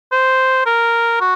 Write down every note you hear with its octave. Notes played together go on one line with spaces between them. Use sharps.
C5
A#4
F#4